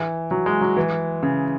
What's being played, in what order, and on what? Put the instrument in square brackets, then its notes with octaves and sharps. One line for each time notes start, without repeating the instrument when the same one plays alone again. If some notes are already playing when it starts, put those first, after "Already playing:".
Already playing: [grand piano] E3
F#3
G#3
F#3
E3
C#3